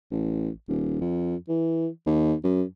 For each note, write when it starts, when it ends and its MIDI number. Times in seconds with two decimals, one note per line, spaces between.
0.11 0.50 33
0.68 0.99 27
1.01 1.36 41
1.48 1.88 52
2.06 2.35 39
2.43 2.64 42